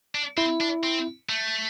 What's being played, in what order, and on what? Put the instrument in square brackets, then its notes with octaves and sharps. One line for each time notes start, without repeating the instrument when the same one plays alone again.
[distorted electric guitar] D4
[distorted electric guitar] C4 [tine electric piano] E4
[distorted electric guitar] D4
C4
A3